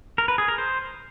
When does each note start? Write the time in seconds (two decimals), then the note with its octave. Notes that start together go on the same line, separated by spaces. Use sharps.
0.18 A#4
0.28 B4
0.38 G#4
0.48 A#4
0.58 C5